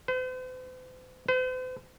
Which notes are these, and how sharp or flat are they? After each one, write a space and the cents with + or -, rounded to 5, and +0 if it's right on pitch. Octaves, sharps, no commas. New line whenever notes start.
C5 -45
C5 -45